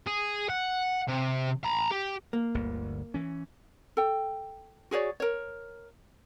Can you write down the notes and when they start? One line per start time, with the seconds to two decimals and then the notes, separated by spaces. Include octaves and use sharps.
0.07 G#4
0.50 F#5
1.08 C3
1.64 A#5 B5
1.91 G4
2.33 A#3
2.54 G1 D2
3.14 E3 C#4
3.97 A4 G5
4.91 F#4 G#4 C#5 D5
5.20 A#4 C#5